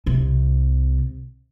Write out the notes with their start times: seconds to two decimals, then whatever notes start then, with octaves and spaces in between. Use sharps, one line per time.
0.06 C2 C3